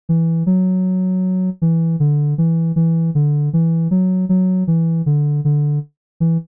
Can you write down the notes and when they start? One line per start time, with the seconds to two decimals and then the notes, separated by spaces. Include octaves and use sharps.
0.09 E3
0.46 F#3
1.62 E3
2.00 D3
2.38 E3
2.76 E3
3.15 D3
3.53 E3
3.91 F#3
4.29 F#3
4.67 E3
5.06 D3
5.45 D3
6.20 E3